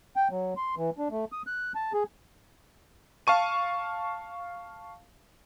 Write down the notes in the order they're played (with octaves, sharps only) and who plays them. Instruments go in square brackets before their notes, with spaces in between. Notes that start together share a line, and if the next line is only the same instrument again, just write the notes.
[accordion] G5
F#3
C6
E3
D4
A3
D#6
F#6
A5
G#4
[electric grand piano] F5 A5 C#6 D#7